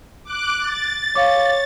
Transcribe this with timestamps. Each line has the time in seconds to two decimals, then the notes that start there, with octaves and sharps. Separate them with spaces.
0.24 D6 F#6
0.58 A6
1.15 C#5 F5 D6